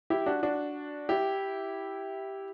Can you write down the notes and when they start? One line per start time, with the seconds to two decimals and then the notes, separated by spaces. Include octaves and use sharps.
0.10 E4 G4
0.26 D4 F#4
0.43 D4 F#4
1.09 E4 G4